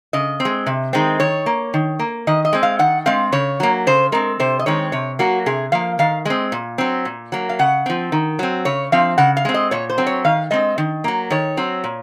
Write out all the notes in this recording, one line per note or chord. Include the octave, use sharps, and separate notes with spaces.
C#3 D#5
C4
G#3
C3
D#3 G#3 C4
D#3 C#5
A#3
D#3
A#3
D#3 D#5
D#5
G#3 C4
F5
D#3 F#5
G#3 C4 F5
C#3 C#5
F#3 A#3
C#3 C5
G#3 C4 A#4
C3 C5
D#5
D#3 G#3 C4 C#5
C3 C#5
F#3 A#3 F#4
C3 G#4
F3 A#3 F5
D#3 F5
G#3 C4 D#5
A#2
F#3 C4
A#2
F#3 A#3
F5
C#3 F#5
F3 C4
D#3
F#3 C4
C#3 C#5
F3 C4 F5
C#3 F#5
F5
G#3 C4
D#5
A#2 C#5
C5
F#3 C4
C#5
D#3 F5
G#3 C4 D#5
D#3
F#3 A#3
D#3 C#5
F#3 C4
A#2